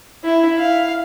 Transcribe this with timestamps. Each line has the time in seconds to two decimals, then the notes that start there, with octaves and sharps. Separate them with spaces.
0.24 E4
0.59 F5